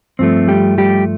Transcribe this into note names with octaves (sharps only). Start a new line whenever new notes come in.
G2 F3 A3 C4
G3 G4
G3 G4